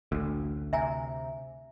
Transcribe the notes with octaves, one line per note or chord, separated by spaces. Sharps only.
A1 D2
C3 E5 G#5 A#5